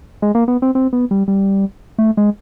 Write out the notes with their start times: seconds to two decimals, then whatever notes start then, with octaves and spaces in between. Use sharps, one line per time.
0.22 G#3
0.35 A#3
0.48 B3
0.62 C4
0.75 C4
0.93 B3
1.11 G3
1.28 G3
1.98 A3
2.17 G#3